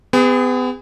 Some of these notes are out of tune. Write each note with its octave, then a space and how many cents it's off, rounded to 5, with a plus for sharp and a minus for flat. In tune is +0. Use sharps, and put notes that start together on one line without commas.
B3 +35 G#4 -30